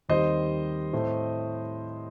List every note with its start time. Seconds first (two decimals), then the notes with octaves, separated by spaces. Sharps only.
0.09 D#2 D#3 G3 C4 C5 D#5
0.93 A2 A3 C4